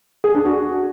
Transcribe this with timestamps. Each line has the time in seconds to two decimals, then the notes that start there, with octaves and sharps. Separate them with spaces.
0.24 G#4
0.35 D4
0.45 F#4